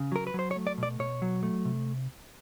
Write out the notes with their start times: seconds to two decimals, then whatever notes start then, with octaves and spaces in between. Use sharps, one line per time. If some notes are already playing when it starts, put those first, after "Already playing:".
Already playing: C#3
0.12 F#3 A#4
0.27 B4
0.34 F#3 C5
0.51 C#5
0.56 A3
0.67 D5
0.78 B2
0.83 D5
0.99 B2 C#5
1.22 F#3
1.43 A3
1.65 C3